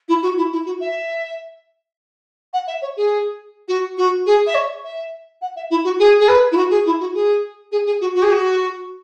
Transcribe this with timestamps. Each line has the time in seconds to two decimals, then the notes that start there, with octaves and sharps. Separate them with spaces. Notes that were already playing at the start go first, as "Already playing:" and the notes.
0.08 E4
0.22 F#4
0.37 E4
0.52 E4
0.66 F#4
0.80 E5
2.53 F#5
2.67 E5
2.82 C#5
2.97 G#4
3.68 F#4
3.97 F#4
4.26 G#4
4.47 E5
4.54 C#5
4.84 E5
5.41 F#5
5.56 E5
5.70 E4
5.84 F#4
5.99 G#4
6.20 G#4
6.28 B4
6.52 E4
6.56 F#4
6.70 G#4
6.86 E4
7.00 F#4
7.14 G#4
7.72 G#4
7.86 G#4
8.01 F#4
8.15 F#4
8.22 G#4
8.31 F#4